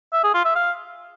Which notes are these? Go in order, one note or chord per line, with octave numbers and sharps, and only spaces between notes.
E5
G#4
F4
E5
F5